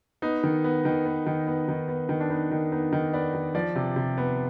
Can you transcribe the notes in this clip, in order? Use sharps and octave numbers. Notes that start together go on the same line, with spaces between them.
B3 D#4
D#3
B3
D#3
B3
D#3
B3
D#3
B3
D#3
D4
B3 D#4
D#3
B3 D#4
D#3
B3 D5
D#3
F3 D5
C3
C3
B3